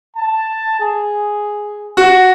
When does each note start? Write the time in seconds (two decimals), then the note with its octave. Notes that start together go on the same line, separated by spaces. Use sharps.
0.16 A5
0.80 G#4
1.97 F#4